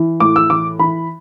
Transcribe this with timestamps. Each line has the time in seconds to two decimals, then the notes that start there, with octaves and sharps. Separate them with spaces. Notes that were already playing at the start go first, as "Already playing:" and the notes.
Already playing: E3
0.20 A2 D6
0.36 E6
0.50 E3 D6
0.79 E3 B5